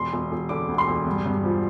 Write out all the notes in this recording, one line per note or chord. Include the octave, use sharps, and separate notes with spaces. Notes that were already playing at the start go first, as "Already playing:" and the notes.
Already playing: E1 C6
E1
E1
D3 D6
D2
C6
E1
G2
G2
F3